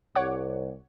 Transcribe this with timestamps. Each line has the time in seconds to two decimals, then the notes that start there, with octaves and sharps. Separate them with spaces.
0.15 C2 C#5 F#5 D6